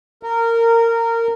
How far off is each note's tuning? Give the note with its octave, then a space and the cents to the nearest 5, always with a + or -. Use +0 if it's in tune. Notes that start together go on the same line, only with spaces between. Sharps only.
A#4 -20